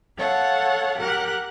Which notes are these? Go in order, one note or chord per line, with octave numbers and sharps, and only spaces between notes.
A4 C#5 F5 F#5
G4 A#4 F#5 F#6